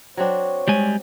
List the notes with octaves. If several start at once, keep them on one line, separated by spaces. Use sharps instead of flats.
F#3 C4 D4 C#5
G3 G#3 G#5